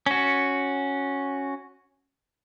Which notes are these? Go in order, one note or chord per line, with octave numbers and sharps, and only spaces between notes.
C#4 F#4